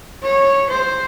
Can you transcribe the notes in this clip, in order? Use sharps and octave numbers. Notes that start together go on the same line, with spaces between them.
C#5
C5